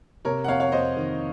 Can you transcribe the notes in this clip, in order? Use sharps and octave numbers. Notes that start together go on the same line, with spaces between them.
C3 A#4 C#5
F#5
F2 C#5 F5
C#5 F5
F2 C5 D#5
D#3